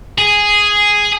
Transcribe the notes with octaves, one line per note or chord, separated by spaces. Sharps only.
G#4